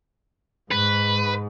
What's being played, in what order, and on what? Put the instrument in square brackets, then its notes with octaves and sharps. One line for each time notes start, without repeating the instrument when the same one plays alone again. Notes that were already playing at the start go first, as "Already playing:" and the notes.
[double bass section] G#2 [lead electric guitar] B4